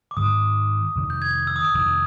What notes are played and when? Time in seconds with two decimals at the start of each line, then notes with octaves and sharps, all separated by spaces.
0.11 D6
0.17 G#2 D#3 G#3 D#6
0.95 F2 C3 D#3
1.10 G6
1.22 G#6
1.47 E6
1.56 D#6
1.64 E6
1.74 F2 C3 D#3 D#6